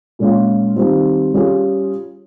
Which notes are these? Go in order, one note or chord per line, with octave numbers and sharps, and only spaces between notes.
A#2 G#3 C#4 F4
D#3 G3 C4 F4
G3 C#4 F4 G#4